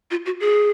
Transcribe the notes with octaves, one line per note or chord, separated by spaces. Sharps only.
F4
F#4
G#4